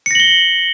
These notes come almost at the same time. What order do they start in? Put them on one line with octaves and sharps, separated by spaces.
C#7 A#6 F#7 G7